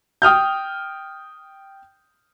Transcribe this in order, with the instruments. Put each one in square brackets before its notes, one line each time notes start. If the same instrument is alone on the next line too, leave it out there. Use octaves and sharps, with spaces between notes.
[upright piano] G5 D#6 F6 G6